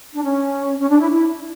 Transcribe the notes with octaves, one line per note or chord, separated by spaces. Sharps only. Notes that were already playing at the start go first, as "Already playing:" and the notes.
D4
C#4
C#4
D4
E4
E4